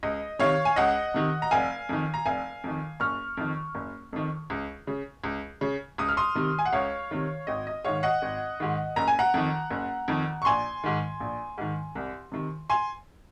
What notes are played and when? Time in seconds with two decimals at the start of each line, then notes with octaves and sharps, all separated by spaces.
0.03 C#2 D#5
0.39 C3 D#3 C#5 F5
0.65 G#5
0.76 C#2 D#5 F#5
1.14 C3 D#3
1.42 A#5
1.51 F1 F5 G#5
1.89 F2 D#3
2.14 A#5
2.26 F1 F5 G#5
2.64 F2 D#3
3.00 F#1 C#6 F6
3.37 F2 D#3
3.75 F#1
4.13 F2 D#3
4.50 C#2
4.87 C#3
5.24 C#2
5.61 C#3
5.98 C#2 D#6
6.09 F6
6.17 C6 D#6
6.35 C3 D#3
6.59 G#5
6.65 F#5
6.72 C#2 C#5 F5
7.11 C3 D#3
7.47 G#1 D#5
7.67 D#5
7.85 G#2 D#3 C#5 F5
8.03 D#5 F#5
8.22 G#1
8.60 G#2 D#3
8.96 F#1 A#5
9.08 G#5
9.19 F#5 A#5
9.34 F2 D#3
9.71 F#1
10.08 F2 D#3
10.42 C#6
10.45 A#1 G#5 C6
10.84 G#2 D#3
11.20 A#1
11.58 G#2 D#3
11.95 C2
12.32 C3 D#3
12.70 G#5 C6